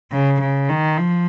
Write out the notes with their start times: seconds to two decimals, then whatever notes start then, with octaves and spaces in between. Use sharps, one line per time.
0.12 C#3
0.41 C#3
0.69 D#3
0.98 F3